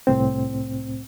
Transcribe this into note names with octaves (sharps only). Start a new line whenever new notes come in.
C2 A2 C4